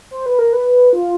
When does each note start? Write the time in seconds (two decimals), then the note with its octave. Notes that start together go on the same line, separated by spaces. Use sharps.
0.11 C5
0.26 B4
0.39 A#4
0.53 B4
0.93 F4